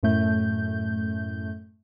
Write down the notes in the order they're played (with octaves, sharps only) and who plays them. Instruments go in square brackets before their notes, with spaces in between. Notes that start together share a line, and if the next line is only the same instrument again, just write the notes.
[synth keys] F#2 A2 A3 G6